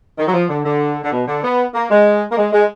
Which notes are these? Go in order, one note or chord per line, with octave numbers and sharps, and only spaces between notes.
D#3
F#3
F3
D3
D3
D3
B2
D3
B3
A#3
G#3
A#3
G#3
G#3